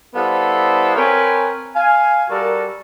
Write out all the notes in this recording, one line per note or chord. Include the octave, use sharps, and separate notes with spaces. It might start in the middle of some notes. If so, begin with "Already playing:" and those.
G3 B3 E4 A4 C5 F5
C4 A#4 B4 C#5 G5 G#5
F5 G#5
G3 F#4 A4 A#4